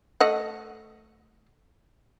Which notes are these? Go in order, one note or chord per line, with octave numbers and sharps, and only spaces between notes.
A3 D#5 F#5